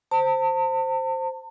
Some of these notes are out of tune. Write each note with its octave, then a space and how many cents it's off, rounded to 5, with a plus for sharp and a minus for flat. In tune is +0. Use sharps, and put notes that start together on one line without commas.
C5 +0 A5 +40